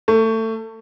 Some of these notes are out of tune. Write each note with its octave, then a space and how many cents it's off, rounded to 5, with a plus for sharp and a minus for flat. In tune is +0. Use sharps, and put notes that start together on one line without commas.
A3 +25